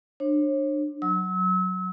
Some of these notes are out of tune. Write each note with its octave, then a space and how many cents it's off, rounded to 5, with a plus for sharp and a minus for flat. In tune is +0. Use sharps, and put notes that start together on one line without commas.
D4 +25 C#5 -40
F#3 +0 E6 -35